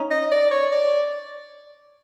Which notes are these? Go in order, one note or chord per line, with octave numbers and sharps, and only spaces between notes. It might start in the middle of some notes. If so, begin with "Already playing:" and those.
Already playing: C#4 D#4
D#5
D5
C#5
D5